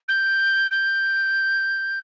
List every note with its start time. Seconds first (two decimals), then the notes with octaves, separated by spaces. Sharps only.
0.08 G6
0.71 G6